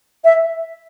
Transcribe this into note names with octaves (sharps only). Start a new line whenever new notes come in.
E5